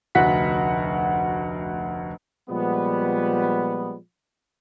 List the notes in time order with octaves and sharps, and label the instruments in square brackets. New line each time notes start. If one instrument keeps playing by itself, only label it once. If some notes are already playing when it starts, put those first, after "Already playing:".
[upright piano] F1 D2 F#4 F#5 B6
[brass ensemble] A#2 F3 G3 G#3 B3